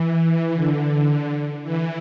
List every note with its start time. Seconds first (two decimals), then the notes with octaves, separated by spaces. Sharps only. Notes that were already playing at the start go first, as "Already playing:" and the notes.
Already playing: E3
0.54 D3
0.90 D3
1.63 E3